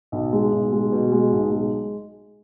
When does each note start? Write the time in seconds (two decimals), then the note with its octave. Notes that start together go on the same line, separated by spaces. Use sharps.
0.12 B1
0.33 G#3
0.52 B1
0.72 G#3
0.92 B2
1.12 G#3
1.33 B1
1.52 G#3